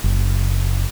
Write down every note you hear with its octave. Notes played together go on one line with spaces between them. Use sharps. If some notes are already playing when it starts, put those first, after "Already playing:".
F#1